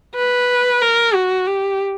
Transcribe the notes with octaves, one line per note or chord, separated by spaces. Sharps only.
B4
A#4
F#4
G4